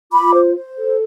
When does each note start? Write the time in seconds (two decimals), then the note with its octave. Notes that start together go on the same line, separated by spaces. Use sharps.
0.12 F4 B5 D6
0.33 C5
0.55 C5
0.77 A4